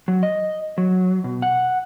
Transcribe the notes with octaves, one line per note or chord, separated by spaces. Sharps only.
F#3
D#5
F#3
B2
F#5